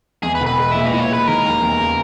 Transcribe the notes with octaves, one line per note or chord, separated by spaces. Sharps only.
E2 G#4
B4
E1
B4
G#3
A#2 E5
D#5
E4
C#5
G#3 B4
D#3 A#4
D#2
E2
C#3